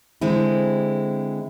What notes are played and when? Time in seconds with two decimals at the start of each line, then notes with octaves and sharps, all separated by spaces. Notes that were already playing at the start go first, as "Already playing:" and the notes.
0.21 D3 G#3 C4 E4